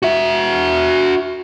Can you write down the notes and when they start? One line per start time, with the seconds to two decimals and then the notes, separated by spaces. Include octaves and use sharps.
0.03 F#4 E5